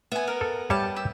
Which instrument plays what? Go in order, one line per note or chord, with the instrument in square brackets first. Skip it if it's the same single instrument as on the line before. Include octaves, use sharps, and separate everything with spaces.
[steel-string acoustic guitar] B3 [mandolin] E5 G#5
[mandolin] A#4
[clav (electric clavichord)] A4
[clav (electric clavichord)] G3 C#5 E5 [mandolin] G5 A5
[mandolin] G4 E6